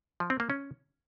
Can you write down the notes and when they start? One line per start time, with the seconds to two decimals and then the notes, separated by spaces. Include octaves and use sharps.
0.20 F3
0.30 C4
0.40 A#3
0.50 C#4